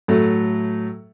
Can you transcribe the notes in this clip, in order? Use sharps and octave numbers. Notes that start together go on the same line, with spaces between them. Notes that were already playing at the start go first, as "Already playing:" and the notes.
A2 F#3 A3